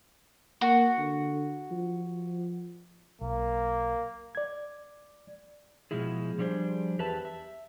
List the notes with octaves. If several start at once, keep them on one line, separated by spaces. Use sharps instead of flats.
A#3 F#4
D3
F3
B1 A#3
D5 G#6
B2 F3 G#3 E4 G#4
F3 G3 D4 G#4 C5
E2 G4 B4 E5 A5
E5